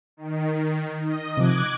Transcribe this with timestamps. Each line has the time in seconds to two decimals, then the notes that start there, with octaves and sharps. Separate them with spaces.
0.17 D#3
1.05 D#5
1.37 C3 F3 D6 F#6 G#6